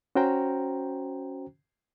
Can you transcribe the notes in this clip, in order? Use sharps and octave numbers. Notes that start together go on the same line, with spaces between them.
C#4 F#4 C5 G5 A#5